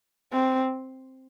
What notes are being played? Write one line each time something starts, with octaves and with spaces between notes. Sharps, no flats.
C4